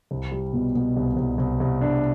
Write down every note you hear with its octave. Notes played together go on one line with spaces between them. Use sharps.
C2
G3
B2
B2
C2
C2
C2
C2
D4